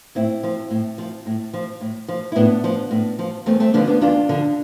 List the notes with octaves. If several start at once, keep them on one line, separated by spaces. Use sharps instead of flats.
A2 C4 E4
F3
A2
F3
A2
F3
A2
F3
E4
A2 B3 D4
F3
A2
F3
E2 A3 C4
A3 C4
D3 F3 B3 D4
B3 D4
E2 D4 F4
D3 F3